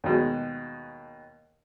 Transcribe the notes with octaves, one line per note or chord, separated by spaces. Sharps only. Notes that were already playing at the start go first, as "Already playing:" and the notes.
D#2 B2 G#3